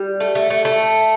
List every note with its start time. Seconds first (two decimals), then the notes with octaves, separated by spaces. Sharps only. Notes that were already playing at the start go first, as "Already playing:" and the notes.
Already playing: G3
0.20 A3
0.35 A3
0.50 A3
0.65 A3